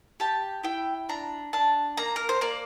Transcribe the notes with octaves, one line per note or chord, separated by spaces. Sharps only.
G4 A5
E4 G5
D4 A#5
D4 A5
A#3 A#5
A#4
C5
A#3 D5